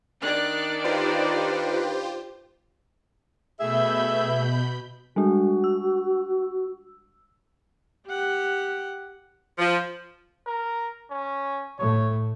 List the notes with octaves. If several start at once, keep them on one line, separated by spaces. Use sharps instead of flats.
D#3 D4 D5 F#6
D#4 F4 G4 B4 C5
B2 A3 G#4 E5 B5 G6
G3 G#3 D4 F#4
E6
G4 F#5
F3
A#4
C#4
A2 A3 C#5